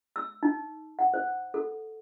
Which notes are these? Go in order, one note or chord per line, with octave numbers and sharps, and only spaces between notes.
E6
D#4
F#5
C5
A4